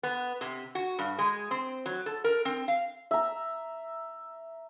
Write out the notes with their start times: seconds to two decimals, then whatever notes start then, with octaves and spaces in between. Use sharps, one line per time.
0.03 B3
0.41 C3
0.75 F#4
0.99 G2
1.18 G#3
1.51 C4
1.86 F#3
2.06 A4
2.24 A#4
2.45 C4
2.68 F5
3.11 E5 A#5